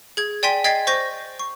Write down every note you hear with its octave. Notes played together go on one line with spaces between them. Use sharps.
G#4 G#6
D5 G5 G#5 C6 B6
D#5 G5 G#6 A6 B6 C7
C5 C#6 G6 A#6
C#6